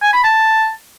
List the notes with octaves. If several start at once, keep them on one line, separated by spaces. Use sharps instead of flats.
G#5
B5
A5